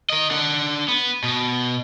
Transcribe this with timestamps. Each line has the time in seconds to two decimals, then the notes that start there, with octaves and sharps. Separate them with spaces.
0.10 A#4 D#5
0.31 D4 F#5
0.88 B3
1.24 B2